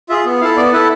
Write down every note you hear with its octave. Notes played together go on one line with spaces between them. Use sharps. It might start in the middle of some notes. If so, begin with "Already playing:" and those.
F4 G#4 E5
B3
E4 A4 F5
B3 D5
E4 A4 B4